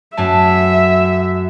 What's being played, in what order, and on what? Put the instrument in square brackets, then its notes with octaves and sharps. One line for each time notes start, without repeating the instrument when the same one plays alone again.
[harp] F#2 A3 A5 [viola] E5